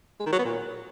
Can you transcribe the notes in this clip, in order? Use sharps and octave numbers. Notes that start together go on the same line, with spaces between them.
G#3
D#3
F#3
B3
A#2